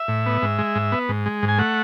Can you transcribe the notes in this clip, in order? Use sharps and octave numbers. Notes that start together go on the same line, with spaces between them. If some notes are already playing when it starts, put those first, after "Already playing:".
Already playing: E5
A2
B3
G#2
G#3
G#2
B3
G#2
G#3
G#2
G#5
A3 F#5